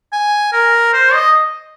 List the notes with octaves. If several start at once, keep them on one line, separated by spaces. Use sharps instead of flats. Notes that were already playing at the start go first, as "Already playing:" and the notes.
G#5
A#4
C5
D#5